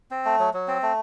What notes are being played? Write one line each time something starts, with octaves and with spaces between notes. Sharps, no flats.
C4
A3
F#3
F#3
C4
A3